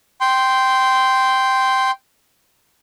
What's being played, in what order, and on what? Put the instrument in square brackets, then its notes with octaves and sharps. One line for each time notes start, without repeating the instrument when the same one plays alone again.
[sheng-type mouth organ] G5 C6